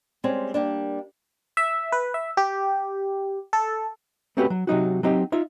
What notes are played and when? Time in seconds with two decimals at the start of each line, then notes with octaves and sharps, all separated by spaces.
0.24 G3 G#3 C4 C#4
0.54 G3 A#3 D4
1.57 E5
1.92 B4
2.14 E5
2.37 G4
3.53 A4
4.37 A3 C4 C#4 F#4 G4 B4
4.50 F#3
4.67 C3 F#3 D#4 F#4
5.03 F#3 C4 D#4 G4
5.32 D#4 F4 E5